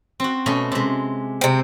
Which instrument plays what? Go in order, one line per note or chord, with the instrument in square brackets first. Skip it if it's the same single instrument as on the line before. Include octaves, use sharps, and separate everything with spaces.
[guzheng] C4 F#4
B2 A3 C#4
C3 G#3
[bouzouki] C3 C4